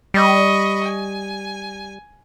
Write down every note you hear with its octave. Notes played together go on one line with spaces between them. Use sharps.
G3 D#5 B5 C#6
G#5